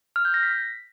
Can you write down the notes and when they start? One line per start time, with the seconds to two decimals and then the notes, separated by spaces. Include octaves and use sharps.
0.16 F6
0.25 G6
0.34 A#6
0.43 B6